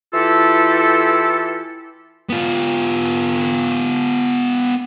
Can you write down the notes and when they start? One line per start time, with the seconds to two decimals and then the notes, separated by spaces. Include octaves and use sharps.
0.14 E3 E4 F4 G4 A4
2.29 B3 F4